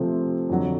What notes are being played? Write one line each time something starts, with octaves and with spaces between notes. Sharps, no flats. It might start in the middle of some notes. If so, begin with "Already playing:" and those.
Already playing: C3 F3 A3 C4
F2 D3 F#3